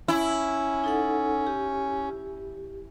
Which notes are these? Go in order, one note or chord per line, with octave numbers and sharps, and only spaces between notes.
C#4 E4
D#4 A4 F#5
G4